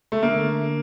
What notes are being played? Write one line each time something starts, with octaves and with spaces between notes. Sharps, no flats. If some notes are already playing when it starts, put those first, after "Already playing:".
A3
D3 A#3